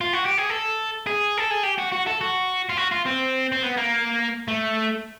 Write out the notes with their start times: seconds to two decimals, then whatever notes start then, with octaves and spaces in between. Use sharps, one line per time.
0.01 F4
0.13 F#4
0.26 G4
0.38 G#4
0.50 A4
1.07 G#4
1.37 A4
1.51 G#4
1.63 G4
1.78 F#4
1.92 F#4
2.06 A4
2.21 F#4
2.69 F4
2.77 F#4
2.92 F4
3.06 C4
3.52 C4
3.63 B3
3.77 A#3
4.48 A3